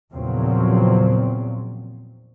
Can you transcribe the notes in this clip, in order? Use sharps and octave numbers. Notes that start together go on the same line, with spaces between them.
E2 A#2 C#3 F3 F#3 C4